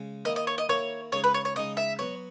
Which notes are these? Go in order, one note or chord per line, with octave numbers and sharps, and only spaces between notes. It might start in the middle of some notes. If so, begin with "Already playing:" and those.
Already playing: C#3 G#3
D#3 A#3 E4 D#5
D#5
C#5
D#5
D#3 A#3 E4 C#5
C#3 G#3 D#4 G#4 C#5
B4
C#5
C#5
C#3 G#3 D#4 G#4 D#5
E5
F#3 B3 F#4 C#5